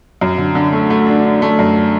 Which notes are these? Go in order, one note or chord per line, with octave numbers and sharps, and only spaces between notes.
F#2
D3
D3
A3
A3
D4
D4
A3
F#2